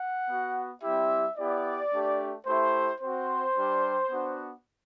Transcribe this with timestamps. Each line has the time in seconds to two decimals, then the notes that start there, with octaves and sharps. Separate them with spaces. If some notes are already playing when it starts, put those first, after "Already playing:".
Already playing: F#5
0.28 B3 F#4
0.82 G3 C4 E4 G4 E5
1.37 B3 E4 G4 D5
1.92 A3 D4 G4
2.46 A3 E4 G4 C5
3.01 C4 F#4 C5
3.55 G3 D4 G4
4.10 B3 D4 F#4